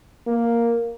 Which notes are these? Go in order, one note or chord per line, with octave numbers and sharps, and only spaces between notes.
A#3